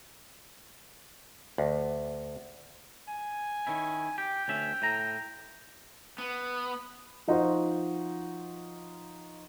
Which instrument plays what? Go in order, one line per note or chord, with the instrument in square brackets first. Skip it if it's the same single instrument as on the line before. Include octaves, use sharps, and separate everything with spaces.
[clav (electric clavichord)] D2
[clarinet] G#5
[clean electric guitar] D#3 C#4 E4
[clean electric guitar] G4 [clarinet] G5
[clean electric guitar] D2 C#4 E5
A2 A#5
[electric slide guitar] B3
[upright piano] F3 D#4 F4 F#4 C5 D#5